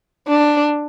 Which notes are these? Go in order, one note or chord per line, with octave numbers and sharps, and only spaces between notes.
D4